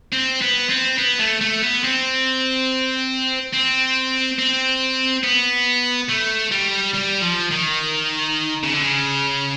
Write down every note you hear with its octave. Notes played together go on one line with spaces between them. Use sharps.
C4
B3
C4
B3
A3
A3
B3
C4
C4
C4
B3
A3
G3
G3
F3
D#3
C#3
D3
C#3